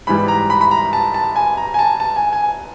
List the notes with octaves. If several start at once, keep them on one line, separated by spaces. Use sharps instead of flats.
G#2 E3 G3 B5
A#5
B5
B5
A#5
A5
A5
G#5
A#5
G#5
A5
A5
G#5
G#5